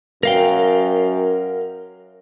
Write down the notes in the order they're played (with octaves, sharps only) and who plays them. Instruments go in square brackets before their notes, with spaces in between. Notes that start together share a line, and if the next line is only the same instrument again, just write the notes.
[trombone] F#2 [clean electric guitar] A#4 F5 G5